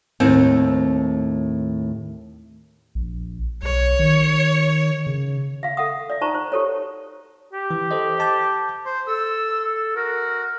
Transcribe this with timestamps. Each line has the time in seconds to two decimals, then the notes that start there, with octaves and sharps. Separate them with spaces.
0.20 D#2 A2 C4
2.95 A#1
3.63 B1 C#5
3.99 D#3
5.07 C#3
5.63 E5 F5
5.77 A4 E5 F#5 D#6
6.10 D5 E5
6.21 D#4 C5 A5 A#5 C#6
6.34 C5
6.52 G4 A4 C#5
7.53 G4
7.71 E3
7.91 A4 C5 D#5
8.20 A5 D6 G6
8.86 C5
9.07 A4 E6
9.96 F#4 A#4